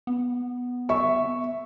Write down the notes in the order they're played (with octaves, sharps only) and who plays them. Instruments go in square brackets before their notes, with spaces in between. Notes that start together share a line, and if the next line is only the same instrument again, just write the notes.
[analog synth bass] B3
[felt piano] E5 C#6